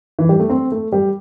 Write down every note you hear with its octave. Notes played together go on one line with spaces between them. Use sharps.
E3
G3
A3
C4
A3
G3